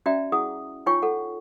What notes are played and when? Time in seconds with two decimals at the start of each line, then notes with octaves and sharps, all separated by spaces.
0.06 C#4 F#4 D5 E5 G5 A#5
0.32 E4 G#4 F#5 D#6
0.86 D#4 F4 C#5 G5 G#5 C#6
1.02 A4 F#5